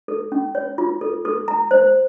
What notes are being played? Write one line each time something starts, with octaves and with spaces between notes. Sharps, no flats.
A4
C#4
C#5
F4
A4
A4
A#5
C5